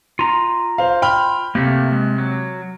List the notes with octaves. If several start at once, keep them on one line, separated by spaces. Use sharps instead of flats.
F4 A#5
C5 F5
G5 B5 F6
C3 A3 A#3
G#3
F#3